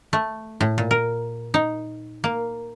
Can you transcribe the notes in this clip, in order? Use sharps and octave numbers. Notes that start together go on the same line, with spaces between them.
A3
A2
A#2
A#4
D#4
A#3